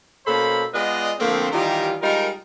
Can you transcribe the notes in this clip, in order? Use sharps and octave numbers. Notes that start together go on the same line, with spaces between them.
B2 A#3 C#4 A4 C5 B5
G#3 B3 F4 B4 D5 D#5
D3 F3 A3 A#3 C4
D#3 E3 G3 F4 G4 A#4
G3 G#3 D#4 F4 A#4